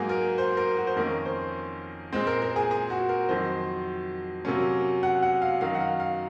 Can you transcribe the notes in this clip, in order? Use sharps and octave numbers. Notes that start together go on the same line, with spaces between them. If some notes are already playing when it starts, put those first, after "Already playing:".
Already playing: G#2 F#3 A#3 G#4
A#4
C5
A#4
F#4
C5
F2 D#3 A#3 C#4 A#4
C5
A#2 G#3 C4 C5
A#4
A#4
G#4
G#4
F#4
A#4
F2 D#3 F#3 C5
C3 F#3 A#3 C#4
F#5
F#5
F5
F#2 D#3 F#3 F5
F#5
F5
F5